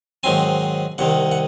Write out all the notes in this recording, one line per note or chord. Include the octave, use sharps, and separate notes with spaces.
G#2 D#3 F#3 C4 G#5
C2 C3 D#3 F#5
F#5